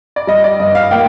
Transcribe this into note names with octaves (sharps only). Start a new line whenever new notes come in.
D5
G3 D#5
D5
G2 D#5
F5
A#3 G5